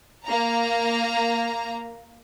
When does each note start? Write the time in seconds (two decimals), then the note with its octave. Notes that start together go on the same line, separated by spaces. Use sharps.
0.25 A#3 A#5